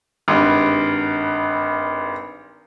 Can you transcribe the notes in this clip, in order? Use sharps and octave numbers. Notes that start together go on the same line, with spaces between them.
G#1 G2